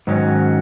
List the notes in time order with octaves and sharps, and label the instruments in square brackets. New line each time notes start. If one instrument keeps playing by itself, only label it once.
[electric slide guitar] G#2 D#3 F#3 C#4